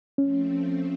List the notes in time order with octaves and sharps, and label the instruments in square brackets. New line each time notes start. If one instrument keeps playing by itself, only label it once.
[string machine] F3 A3 C4 [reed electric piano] C#4